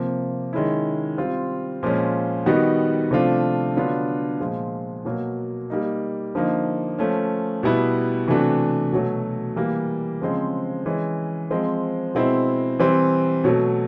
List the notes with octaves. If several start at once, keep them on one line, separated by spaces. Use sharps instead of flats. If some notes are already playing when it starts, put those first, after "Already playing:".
Already playing: C3 F3 A#3
D#3 G#3 C#4 E4
G3 C4 F4
A#2 F3 G#3 C#4
D#3 G3 B3 D#4 F#4
C3 F3 A3 D4 F4
D3 F#3 B3 D4 F4
A#2 F3 G#3
B2 F#3 A#3
G3 A#3 D#4
D3 F3 A#3 D#4
F3 A3 C#4
B2 G3 B3 E4
C3 E3 A3 D4 F#4
B2 F#3 A3
E3 G3 A#3
C#3 F3 G#3 C4
E3 G#3 C#4
F3 G#3 C4
B2 G#3 C4 E4
E3 G3 C4
B2 F#3 A3